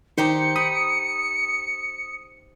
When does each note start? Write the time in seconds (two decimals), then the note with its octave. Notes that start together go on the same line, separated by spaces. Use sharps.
0.18 D#3 D#4 G4 C5 C#7
0.56 B5 D#6